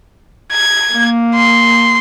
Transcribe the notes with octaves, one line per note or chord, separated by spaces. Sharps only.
G#6
A#3
C6